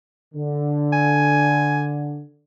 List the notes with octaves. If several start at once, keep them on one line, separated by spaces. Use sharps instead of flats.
D3
G#5